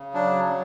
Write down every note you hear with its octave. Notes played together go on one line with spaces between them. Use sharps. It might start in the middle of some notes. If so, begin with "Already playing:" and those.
Already playing: C#3
F#3 D4
F#3